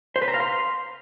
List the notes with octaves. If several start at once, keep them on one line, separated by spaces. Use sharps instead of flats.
C5
B4
A#5
F5
C6